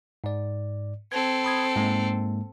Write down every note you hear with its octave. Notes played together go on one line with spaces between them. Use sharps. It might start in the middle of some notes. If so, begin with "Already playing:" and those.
G#2 D5
C4 A4 G#6
B5 D#6 G#6
G#2 G#3 A#3